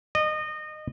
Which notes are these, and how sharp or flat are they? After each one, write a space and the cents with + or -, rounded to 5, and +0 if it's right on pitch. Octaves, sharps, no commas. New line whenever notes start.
D#5 -25